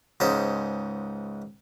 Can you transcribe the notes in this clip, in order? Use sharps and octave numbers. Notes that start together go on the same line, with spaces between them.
C#2 G#2 C#4 C5